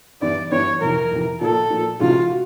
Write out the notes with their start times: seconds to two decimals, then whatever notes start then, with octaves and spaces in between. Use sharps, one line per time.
0.22 G2 E3 G3 B3 E4 D5
0.52 G2 E3 G3 B3 E4 C#5
0.81 F2 C3 E3 A#4
1.11 F2 C3 E3
1.41 A#2 F3 A#3 A4
1.70 A#2 F3 A#3
2.00 C3 E3 G#3 C#4 F4 F#4
2.30 F#4